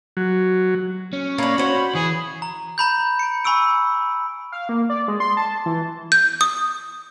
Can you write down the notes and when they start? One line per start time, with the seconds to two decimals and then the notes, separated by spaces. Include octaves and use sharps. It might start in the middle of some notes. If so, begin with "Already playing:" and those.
0.17 F#3
1.13 C#4
1.38 A#3 D4 C#5 B5
1.58 F#4 C5 C#5
1.95 E3 G#4
2.42 A#5
2.78 A#5 B5 G6
3.19 C#7 D7
3.45 G#5 B5 C#6 E6 D7
4.52 F5
4.69 A#3
4.90 D5
5.08 G#3
5.20 C6
5.37 A5
5.66 E3
6.12 G6
6.41 D#6